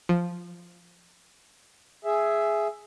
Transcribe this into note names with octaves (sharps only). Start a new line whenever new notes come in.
F3
G#4 E5